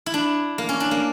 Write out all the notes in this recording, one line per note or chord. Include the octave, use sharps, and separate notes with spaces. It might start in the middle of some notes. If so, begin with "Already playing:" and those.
E4
D4
A#3
C#4
D4
A#3